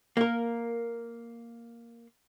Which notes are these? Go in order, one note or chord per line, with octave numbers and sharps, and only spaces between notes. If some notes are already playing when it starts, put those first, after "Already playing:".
A#3 A#4